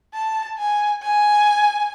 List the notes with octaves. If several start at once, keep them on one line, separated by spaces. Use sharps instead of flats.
A5
G#5
G#5